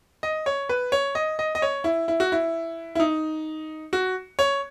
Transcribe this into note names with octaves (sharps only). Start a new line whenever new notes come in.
D#5
C#5
B4
C#5
D#5
D#5
D#5
C#5
E4
E4
F#4
E4
E4
D#4
F#4
C#5